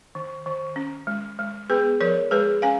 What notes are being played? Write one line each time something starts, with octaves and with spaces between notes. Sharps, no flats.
D#3
D#3
C#4
G#3
G#3
B3 G#4 B4
F3 A#4 C#5
G#3 G#4 B4
C#4 F5 G#5